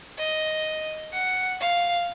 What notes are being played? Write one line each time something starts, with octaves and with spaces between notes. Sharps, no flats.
D#5
F#5
F5